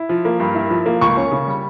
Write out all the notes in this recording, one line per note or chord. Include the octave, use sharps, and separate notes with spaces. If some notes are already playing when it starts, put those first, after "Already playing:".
Already playing: E4
F3
A#3
G2
E4
F3
A#3
C#2 C#6
C#4
C#3
G3